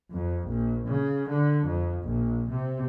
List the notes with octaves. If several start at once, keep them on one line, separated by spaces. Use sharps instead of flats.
F2
A#1
C#3
D3
F2
A#1
C3